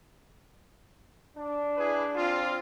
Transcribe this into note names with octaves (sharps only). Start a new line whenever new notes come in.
D4
E4 G#4 B4
C4 F4